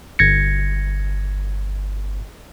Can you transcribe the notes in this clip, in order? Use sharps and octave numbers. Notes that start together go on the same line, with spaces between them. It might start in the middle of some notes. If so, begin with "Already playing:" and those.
G1 G#6 A#6 C#7